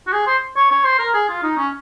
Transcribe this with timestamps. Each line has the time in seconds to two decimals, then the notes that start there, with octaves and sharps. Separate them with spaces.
0.07 F#4
0.13 G#4
0.26 C5
0.56 C#5
0.71 C#5
0.84 C5
0.99 A#4
1.14 G#4
1.29 F4
1.43 D#4
1.57 C#4